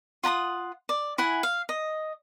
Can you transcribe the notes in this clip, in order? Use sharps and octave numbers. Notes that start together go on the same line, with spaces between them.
F4 F#5 A#5 D#6
D5
E4 F#5 G#5
F5
D#5